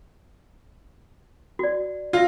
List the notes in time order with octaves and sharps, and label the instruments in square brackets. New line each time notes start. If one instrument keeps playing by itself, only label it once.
[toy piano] F#4 D5
[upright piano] F4 [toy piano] E5 E6